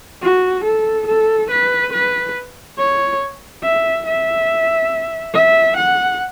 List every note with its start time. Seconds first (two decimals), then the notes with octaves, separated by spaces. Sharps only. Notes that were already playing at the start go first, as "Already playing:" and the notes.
0.22 F#4
0.65 A4
1.07 A4
1.51 B4
1.93 B4
2.78 C#5
3.64 E5
4.07 E5
5.34 E5
5.77 F#5